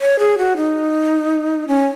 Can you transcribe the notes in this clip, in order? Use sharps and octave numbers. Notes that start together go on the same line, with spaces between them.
C#5
G#4
F#4
D#4
C#4